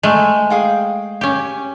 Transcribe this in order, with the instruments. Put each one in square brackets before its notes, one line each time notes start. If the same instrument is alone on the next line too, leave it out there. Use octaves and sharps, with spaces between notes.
[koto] G#3 A3
[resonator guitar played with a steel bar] G#4 F5 G5
[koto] C#4 G4